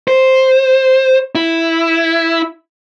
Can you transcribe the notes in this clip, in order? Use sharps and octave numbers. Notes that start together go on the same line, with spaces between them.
C5
E4